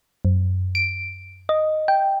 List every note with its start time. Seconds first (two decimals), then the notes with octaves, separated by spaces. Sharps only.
0.25 F#2
0.75 D7
1.49 D#5
1.88 G5